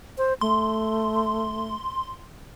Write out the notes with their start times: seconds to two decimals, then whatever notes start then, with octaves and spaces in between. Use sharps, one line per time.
0.18 C5
0.41 A3 C6